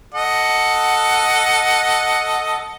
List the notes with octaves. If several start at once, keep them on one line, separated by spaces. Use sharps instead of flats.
A4 D#5 F#5